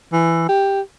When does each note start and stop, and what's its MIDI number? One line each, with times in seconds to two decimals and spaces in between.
0.13 0.48 52
0.49 0.81 67